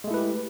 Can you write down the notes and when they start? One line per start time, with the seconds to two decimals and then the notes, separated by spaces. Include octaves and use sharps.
0.04 G#3
0.07 A3
0.11 E4
0.14 B4
0.17 G4